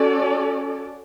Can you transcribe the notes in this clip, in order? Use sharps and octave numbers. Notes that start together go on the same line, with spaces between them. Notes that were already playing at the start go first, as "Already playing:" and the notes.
Already playing: C#4 F#4 A4 D5